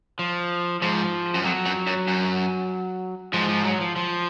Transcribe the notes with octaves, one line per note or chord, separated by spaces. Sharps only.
F3
G#2 F3
F#2
F2 F#3
F#2
F#2
F#2
G#2 F3
F3
F#3
F3
F3